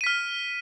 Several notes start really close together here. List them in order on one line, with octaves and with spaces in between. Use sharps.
D#7 B6 F6